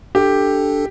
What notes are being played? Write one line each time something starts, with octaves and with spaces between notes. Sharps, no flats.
D4 G4 A4